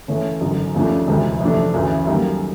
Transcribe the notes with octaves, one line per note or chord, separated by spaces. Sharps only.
C#3 E3 A3 C#4
G#1 F#2 D3
D#2 C#3 F3 A3 D4
D2 C3 E3 G#3
F2 C3 E3 A3 D4
D2 C#3 E3
F#2 D#3 G3 A#3